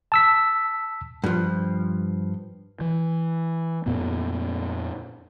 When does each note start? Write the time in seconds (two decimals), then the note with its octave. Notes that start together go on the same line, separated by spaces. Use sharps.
0.12 A5 E6 B6
1.24 G2 F3
2.81 E3
3.86 F2 A#2 B3